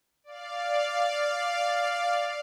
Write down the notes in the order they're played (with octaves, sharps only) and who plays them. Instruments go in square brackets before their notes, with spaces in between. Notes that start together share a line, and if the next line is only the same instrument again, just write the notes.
[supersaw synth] D5 F5